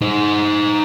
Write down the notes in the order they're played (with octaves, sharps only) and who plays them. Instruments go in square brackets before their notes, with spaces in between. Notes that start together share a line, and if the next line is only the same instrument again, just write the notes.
[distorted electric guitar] D#4 C5